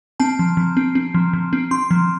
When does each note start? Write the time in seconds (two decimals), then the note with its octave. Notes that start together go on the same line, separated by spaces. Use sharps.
0.20 C4 A5
0.39 F3
0.57 F3
0.77 C4
0.95 C4
1.14 F3
1.33 F3
1.53 C4
1.71 C4 C6
1.91 F3